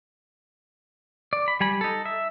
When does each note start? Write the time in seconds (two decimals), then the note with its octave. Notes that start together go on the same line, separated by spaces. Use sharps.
1.33 D5
1.48 B5
1.60 G3 G#5 B5
1.81 D#4 A4
2.05 E5